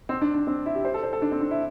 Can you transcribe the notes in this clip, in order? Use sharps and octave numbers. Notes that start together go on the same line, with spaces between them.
C4
D4
D4
C4
E4
G4
C5
A4
C5
A4
D4
C4
D4
E4